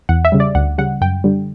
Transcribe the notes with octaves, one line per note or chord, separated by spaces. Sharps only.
E2 F#5
E5
C#3 G3
D5
D2 F#5
C#3 G3 F#5
F#2 G5
D3 G3